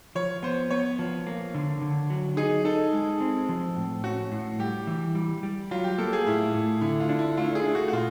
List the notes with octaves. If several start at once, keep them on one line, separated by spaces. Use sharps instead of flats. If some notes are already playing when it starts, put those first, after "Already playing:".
F3 C#5
B3 C5
B3 C#5
F3
A#3
D3
D3
F#3
D#4 G#4
D#4 A4
G#3
C4
F3
A2
C#4 F#4
A2
G3 G4
E3
G3
G3
F#3 F4
G4
A#3 A4
G#4
A2 E4
A2
D3 E4
F4
D4
E4
A3 F4
G#4
A3
F#4
F#4
A#2 F4